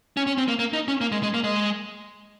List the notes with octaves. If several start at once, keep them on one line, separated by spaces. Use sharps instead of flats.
C#4
C#4
C4
A#3
A#3
D#4
C#4
A#3
G#3
G#3
A#3
G#3